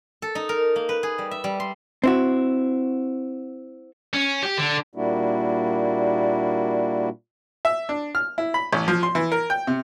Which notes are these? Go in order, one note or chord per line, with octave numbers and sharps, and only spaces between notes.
A4
D#4
A#4
A#3
B4
G#4
G3
E5
G3
C6
C4 E4 F#4
C#4
G4
D3
A#2 G3 A#3 D4 E4 F#4
E5
D4
F6
E4
B5
A1
F3
C6
E3
A#4
G5
C3